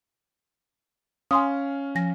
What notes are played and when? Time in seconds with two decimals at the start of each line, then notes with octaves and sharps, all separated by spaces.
1.31 C#4 F5 G#5 C6 D#6
1.95 F3 G#5 A#6